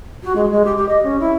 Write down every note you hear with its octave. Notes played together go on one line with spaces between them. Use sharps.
F#4
G#3
G#3
G4
G4
D#5
C#4
E4